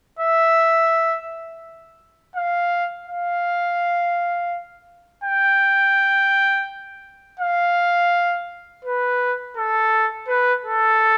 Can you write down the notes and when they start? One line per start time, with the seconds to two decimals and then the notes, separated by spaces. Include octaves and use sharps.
0.19 E5
2.36 F5
3.07 F5
5.24 G5
7.39 F5
8.84 B4
9.57 A4
10.28 B4
10.65 A4